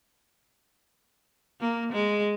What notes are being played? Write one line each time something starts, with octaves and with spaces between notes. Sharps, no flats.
A#3
G#3